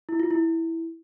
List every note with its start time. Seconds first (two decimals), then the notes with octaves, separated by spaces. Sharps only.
0.09 E4
0.20 F4
0.31 E4